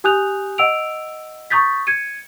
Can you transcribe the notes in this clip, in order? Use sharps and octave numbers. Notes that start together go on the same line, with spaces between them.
G4 G#5 D#6 F#6 G6 F7
D#5 F#5 E6 D7 F7
A#5 C#6 D#6 G6 A6 B6
G#6 C#7 D#7